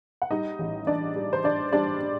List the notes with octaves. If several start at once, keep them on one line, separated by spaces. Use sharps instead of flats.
F#5
G3 D#4 D#5
A1
D4 D5
G3
C5
D4 D5
G3 D4 D5
D4